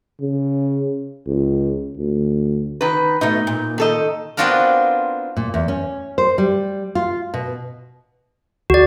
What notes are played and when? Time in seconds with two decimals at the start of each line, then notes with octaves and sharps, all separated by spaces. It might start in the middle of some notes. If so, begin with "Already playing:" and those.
0.21 C#3
1.27 C#2
1.98 D2
2.81 D#3 B4
3.21 B2 A3 D#4
3.47 A#2
3.78 D#3 A4 D#5
4.37 B3 C4 D4 F4 F#4 A#4
5.37 A#2
5.54 E2
5.68 C#4
6.18 C5
6.38 G3
6.95 F4
7.34 B2
8.70 D2 F#4 D5